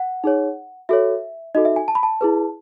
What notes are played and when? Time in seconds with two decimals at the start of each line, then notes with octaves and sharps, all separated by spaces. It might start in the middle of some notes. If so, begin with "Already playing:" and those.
Already playing: F#5
0.24 D#4 G#4 C#5
0.89 F#4 A4 C#5 E5
1.55 D#4 F#4 A4 D#5
1.65 E5
1.76 G#5
1.88 A5
1.95 B5
2.03 A5
2.21 E4 G#4 B4